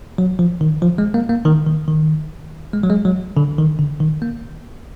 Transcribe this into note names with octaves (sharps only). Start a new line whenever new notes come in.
F#3
F3
D#3
F3
G#3
A#3
A#3
D#3
D#3
D#3
G#3
F#3
G#3
F#3
D3
D#3
D3
D#3
A#3